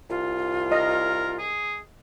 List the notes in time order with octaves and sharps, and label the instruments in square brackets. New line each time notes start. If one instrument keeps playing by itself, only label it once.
[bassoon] C2 [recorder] F4
[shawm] A#4 [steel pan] D#5
[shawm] G#4